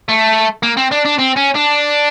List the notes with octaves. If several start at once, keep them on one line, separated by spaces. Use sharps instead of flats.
A3
A#3
C4
D4
D4
C4
C#4
D4